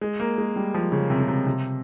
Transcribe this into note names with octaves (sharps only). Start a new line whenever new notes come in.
G#3
A#3
G#3
G3
F3
C#3
C3
C#3
C3
C3